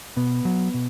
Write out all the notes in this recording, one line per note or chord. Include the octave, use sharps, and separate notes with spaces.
B2 B3
F#3
B2